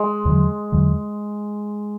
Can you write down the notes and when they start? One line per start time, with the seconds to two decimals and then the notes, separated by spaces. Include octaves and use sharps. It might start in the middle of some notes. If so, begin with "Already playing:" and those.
Already playing: G#3
0.25 E2 D3 F#3
0.72 E2 D3 F#3